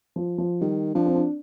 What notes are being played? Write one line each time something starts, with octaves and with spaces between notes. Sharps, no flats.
F3
F3
D#3 G3
F3 D4
C4
D4